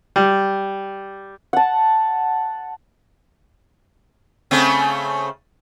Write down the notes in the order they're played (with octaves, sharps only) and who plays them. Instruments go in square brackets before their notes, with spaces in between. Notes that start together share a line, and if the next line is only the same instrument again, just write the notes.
[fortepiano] G3
[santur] F#5 A5
[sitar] C#3 A3 C4